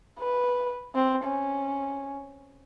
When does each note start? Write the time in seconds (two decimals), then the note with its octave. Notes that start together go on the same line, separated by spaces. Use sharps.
0.19 B4
0.95 C4
1.24 C#4